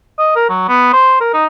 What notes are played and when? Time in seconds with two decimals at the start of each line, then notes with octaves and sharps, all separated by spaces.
0.19 D#5
0.36 A#4
0.49 F#3
0.69 B3
0.93 C5
1.21 A#4
1.34 D#4